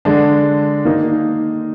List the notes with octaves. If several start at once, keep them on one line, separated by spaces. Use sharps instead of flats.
D3 G#3 D4
D#3 A#3 D#4